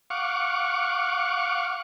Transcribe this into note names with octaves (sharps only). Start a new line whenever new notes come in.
F5 F#5 C#6 D6